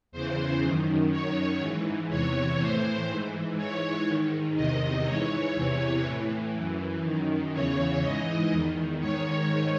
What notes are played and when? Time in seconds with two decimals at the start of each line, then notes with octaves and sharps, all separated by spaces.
0.12 E2 C#3 E3 C5
0.61 F#2 D#3
1.11 F#2 D#3 C#5
1.60 G#2 E3
2.09 E2 C3 E3 C#5
2.59 A2 E3 C5
3.08 G#2 E3
3.57 G#2 E3 C#5
4.07 G#2 D#3
4.56 E2 C3 D#3 D#5
5.05 G#2 E3 C#5
5.55 E2 C3 E3 C#5
6.04 A2 E3
6.54 F#2 E3
7.04 F#2 D#3
7.53 E2 C#3 E3 C#5
8.02 G#2 E3 D#5
8.51 E2 D#3
9.00 G#2 D#3 C#5